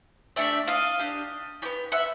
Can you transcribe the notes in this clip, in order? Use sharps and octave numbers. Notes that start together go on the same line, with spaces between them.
A3 D4 G4 D5 E5
D#5 F5
D4 G4
B3 D4 G4
E5 F#5